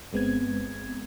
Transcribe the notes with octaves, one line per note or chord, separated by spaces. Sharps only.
G1 G#3 B3 C4 G#6